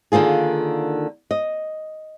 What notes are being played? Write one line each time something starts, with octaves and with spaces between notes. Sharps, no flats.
D3 D#3 A#3 F4 G#4
D#5